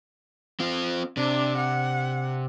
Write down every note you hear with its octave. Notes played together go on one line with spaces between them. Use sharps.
C4 F4
C3 D4
F#5